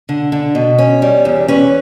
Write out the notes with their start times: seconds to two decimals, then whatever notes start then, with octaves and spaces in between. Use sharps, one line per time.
0.09 D3
0.32 D3
0.55 B2
0.78 C#4
1.02 G3
1.25 E2
1.48 C#4 B4